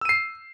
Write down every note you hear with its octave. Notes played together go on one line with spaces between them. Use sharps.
E6 C7 D#7